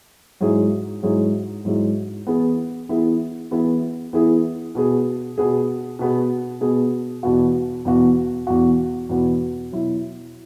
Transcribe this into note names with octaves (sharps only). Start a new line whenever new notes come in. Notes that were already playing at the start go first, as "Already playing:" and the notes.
G#2 F#3 E4 G#4
G#2 F#3 E4 G#4
G#2 F#3 E4 G#4
E3 B3 E4 G#4
E3 B3 E4 G#4
E3 B3 E4 G#4
E3 B3 E4 G#4
B2 B3 G#4
B2 B3 G#4
B2 B3 G#4
B2 B3 G#4
E2 B2 B3 F#4
E2 B2 B3 F#4
E2 B2 B3 F#4
E2 B2 B3 F#4
B2 F#3 E4